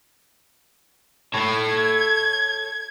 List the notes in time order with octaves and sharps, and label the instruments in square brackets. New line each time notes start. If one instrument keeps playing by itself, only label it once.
[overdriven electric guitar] A4 C#5 [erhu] G#6